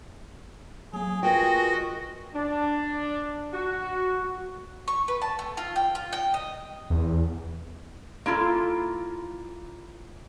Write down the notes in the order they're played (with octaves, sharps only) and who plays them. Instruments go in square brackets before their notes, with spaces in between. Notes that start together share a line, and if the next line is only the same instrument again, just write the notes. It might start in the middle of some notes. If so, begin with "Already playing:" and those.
[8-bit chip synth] F#3 A#3 [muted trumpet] G#4
[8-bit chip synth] F4 A#4 B4 [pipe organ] F#4 D#5 [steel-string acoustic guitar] G5
[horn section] D4
F#4
[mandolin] C#6
B4
A5
A3
F4
G5
F4
G5
D#5
[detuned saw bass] E2
[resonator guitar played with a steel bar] A#3 E4 F4 A4